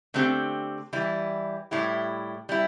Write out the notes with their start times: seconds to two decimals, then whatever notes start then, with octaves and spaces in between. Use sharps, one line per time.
0.14 D3 A3 C4 G4
0.93 E3 G3 E4
1.71 A2 G3 E4 G4
2.49 G3 E4